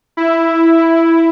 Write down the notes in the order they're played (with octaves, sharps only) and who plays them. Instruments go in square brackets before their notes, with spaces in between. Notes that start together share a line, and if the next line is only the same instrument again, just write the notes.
[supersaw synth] E4